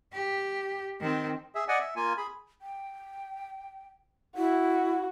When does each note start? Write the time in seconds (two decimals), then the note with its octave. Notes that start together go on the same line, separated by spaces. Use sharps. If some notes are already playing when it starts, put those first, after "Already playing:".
0.13 G4
1.01 D#3 C4
1.55 G#4 E5
1.68 D5 D#5 F#5 G#5
1.80 E5
1.96 A#3 F4 G#5
2.17 G#4 B5
2.62 G5
4.37 E4 F#4